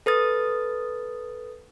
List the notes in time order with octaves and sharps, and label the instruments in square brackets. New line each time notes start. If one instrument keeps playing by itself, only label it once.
[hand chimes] A4 B4 D#6 A6